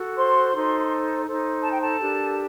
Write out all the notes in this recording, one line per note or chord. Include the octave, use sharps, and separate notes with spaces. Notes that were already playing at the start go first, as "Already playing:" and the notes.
Already playing: F#4 A4
C5 C6
D#4 A4 C5
D#4 A4 C5
A5
G5
A4 A5
D4 G4 A#4